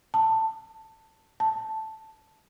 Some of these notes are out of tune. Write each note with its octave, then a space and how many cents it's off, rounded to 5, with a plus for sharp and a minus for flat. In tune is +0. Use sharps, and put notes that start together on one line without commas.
A5 +15
A5 -5